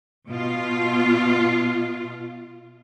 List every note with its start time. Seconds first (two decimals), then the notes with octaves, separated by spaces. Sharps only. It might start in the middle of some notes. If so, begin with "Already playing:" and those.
0.29 B2 F4